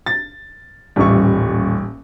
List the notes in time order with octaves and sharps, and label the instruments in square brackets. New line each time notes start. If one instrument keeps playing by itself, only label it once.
[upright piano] A6
[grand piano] D#1 C#6 [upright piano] A1 G3